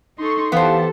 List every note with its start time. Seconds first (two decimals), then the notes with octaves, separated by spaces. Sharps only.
0.18 D#4 A4 C6 C#6
0.52 E3 B3 G4 A4 C5 F5 A5